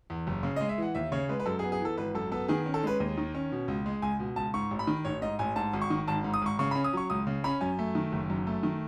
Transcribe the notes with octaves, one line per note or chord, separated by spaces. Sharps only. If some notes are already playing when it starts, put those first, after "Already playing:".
E2
F#1
C#3
D#5
G#3
E5
E3 F#5
D#2 E5
C#3 C#5
G#3 B4
B4
F#2 A4
G#4
B3
G#4
E3 A4
G#1 B4
F#2 A4
B3 A4
D#3 G#4
C#4
A4
G#3 B4
D#2
D#3
C#4
B2
C#2
G#3
C#2 G#5
B2
C#2 A5
G#2 C#6
A1
B5
D#3
A1 C#5
G#2 D#5
A1 G#5
G#2 A5
G#1
C#6
D#3
G#1 A5
G#2
D#6
G#1 C#6
C#3 C#6
B5
C#4
D#6
F#3 C#6
C#2 D#6
C#3
C#4 B5
F#2 G#5
A3
D#3
F#1
F#2
A3
D#3